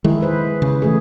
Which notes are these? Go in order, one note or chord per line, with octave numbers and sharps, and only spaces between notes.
D#3 G#3 E4 G#4
G#4 B4 C5
C#3
E3 A3 G#4